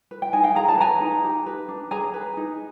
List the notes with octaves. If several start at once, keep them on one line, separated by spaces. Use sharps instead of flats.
B4
G5
D#4 G#5
F5 G5
G#4 A#5
A5
B4 G#5 A#5
D#4
G4
B4
D4
G#4 G#5 A#5
B4
D#4